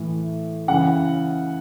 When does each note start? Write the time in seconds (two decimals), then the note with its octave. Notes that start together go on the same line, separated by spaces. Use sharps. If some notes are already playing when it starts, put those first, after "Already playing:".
Already playing: A2 E3
0.68 C#3 E3 F#5